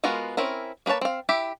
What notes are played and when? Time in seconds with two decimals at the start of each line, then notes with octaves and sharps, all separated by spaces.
0.04 G#3 B3 F4 F#4 A#4
0.37 C4 C#4 E4 A#4
0.86 A#3 G#4 B4 C#5 A5
1.01 C4 F5
1.29 E4 G4 E5